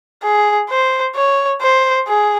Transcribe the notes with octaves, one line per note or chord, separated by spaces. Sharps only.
G#4
C5
C#5
C5
G#4